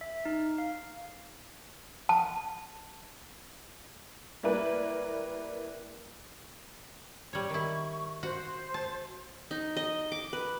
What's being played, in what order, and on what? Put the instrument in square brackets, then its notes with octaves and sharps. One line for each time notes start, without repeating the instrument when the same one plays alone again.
[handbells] E5
D#4
F5
[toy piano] A5
[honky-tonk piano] G3 A#3 E4 A#4 B4 D5
[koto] G3 C#5 [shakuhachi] C#6
[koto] D#3 E4
[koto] F#4 [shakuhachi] C5
[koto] A5
[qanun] D#4
D#5
D6
B4